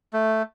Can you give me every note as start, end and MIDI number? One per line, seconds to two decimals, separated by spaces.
0.13 0.42 57